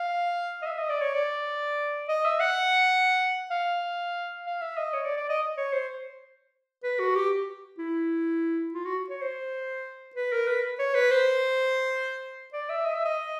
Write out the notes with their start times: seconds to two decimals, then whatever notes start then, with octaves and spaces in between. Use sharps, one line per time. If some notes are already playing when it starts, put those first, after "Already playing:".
Already playing: F5
0.62 D#5
0.67 E5
0.79 D#5
0.89 D5
1.01 C#5
1.14 D5
2.09 D#5
2.25 E5
2.40 F#5
3.51 F5
4.47 F5
4.61 E5
4.78 D#5
4.94 C#5
5.05 D5
5.17 D5
5.30 D#5
5.58 C#5
5.73 C5
6.84 B4
7.00 F#4
7.15 G4
7.78 E4
8.74 F4
8.86 F#4
9.10 C#5
9.22 C5
10.15 B4
10.32 A#4
10.48 B4
10.79 C#5
10.95 B4
11.11 C5
12.53 D5
12.70 E5
12.86 D#5
12.95 E5
13.05 D#5